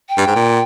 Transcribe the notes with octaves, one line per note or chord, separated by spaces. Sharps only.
G5
G2
G#2
A#2